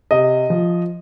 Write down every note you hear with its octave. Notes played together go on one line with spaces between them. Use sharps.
C3 D#5
F3